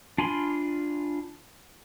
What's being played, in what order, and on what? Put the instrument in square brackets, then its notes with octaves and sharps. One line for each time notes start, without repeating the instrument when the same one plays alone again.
[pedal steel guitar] D4 F4 G#5 B5 C6